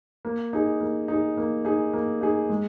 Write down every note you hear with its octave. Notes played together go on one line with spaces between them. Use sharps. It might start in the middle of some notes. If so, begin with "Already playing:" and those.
A#3
D#4 G#4
A#3
D#4 G#4
A#3
D#4 G#4
A#3
D#4 G#4
G#3